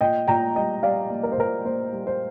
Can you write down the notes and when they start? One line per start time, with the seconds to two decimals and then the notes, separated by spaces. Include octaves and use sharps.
0.01 A#2 D#5 G5
0.28 A#2 G5 A#5
0.56 G3 D#5 G5
0.82 G3 D5 F5
1.10 A#3
1.23 A#4
1.32 C5
1.37 A#2 A#4
1.65 A#3 C5
1.93 G3
2.07 C5